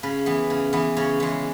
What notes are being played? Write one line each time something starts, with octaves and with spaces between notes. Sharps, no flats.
C#3 B4
E3 B3
C#3
E3 B3
C#3 C#5
E3 G#3